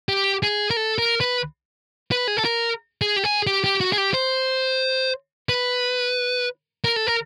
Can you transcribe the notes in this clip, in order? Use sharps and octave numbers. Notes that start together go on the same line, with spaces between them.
G4
G#4
A#4
A4
A#4
B4
B4
G#4
A4
A#4
G#4
G4
G#4
G4
G4
F#4
G#4
G4
C5
B4
A#4
A4
A#4